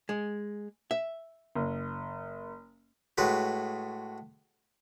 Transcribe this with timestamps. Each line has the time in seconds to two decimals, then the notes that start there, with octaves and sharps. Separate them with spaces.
0.09 G#3
0.91 E5
1.55 F#1
3.18 A2 G#3 F#4 B4